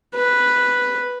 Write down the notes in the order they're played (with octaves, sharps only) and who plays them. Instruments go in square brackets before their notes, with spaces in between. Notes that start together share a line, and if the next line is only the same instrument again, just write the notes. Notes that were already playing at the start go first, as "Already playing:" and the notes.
[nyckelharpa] B4